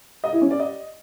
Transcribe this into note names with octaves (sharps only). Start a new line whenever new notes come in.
D#5
E4
C#4
D5
D#5